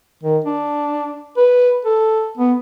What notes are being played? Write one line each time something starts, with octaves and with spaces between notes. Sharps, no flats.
D#3
D4
B4
A4
B3